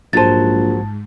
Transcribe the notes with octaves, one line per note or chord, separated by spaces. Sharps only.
A#1 G#2 F#3 C5 A5 A6